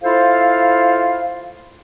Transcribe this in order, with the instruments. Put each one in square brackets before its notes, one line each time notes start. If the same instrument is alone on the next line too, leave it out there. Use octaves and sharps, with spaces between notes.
[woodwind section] E4 F4 A4 C5 F5